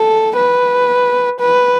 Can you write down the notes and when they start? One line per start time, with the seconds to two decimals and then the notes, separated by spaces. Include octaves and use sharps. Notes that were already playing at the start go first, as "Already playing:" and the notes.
Already playing: A4
0.36 B4
1.40 B4